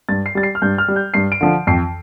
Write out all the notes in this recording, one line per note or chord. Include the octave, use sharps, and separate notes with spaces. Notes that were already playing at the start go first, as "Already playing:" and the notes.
G2 A6
C7
G3 A6
C7
F6
G2 G6
F6
G3
G6
G2 C7
D7
D3 F3
F2 C7